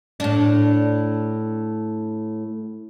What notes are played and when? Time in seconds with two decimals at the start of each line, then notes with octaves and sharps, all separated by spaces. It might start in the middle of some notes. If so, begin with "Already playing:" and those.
0.20 A2 D4